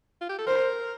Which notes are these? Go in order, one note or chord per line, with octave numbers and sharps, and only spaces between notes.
F4
G4
A4
A#4 C5